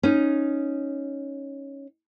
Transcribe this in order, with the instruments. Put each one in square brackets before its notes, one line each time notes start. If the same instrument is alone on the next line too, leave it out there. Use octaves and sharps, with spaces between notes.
[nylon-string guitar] C#4 D#4